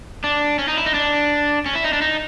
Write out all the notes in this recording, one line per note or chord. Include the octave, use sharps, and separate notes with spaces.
D4
C#4
D#4
E4
D#4
D4
C#4
E4
D#4
D4
D#4